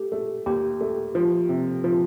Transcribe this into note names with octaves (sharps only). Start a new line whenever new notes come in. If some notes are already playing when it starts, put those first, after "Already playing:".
Already playing: A3 G4
A3
D#2 G4
A3
F3
C3
F3